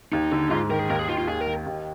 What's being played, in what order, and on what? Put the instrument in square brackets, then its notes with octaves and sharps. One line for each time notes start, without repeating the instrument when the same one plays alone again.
[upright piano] D#2 [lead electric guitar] D#4
[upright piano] D3
[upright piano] G#2 [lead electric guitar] F4
[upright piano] D#3 [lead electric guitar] A#4
[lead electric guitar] G#4
[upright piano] D#2 [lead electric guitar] A#4
[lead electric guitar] G#4
[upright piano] D#3 [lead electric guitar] F4
[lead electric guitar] F4
[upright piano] D#2 [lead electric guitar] G#4
[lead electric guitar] A#4
[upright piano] D#3
D#2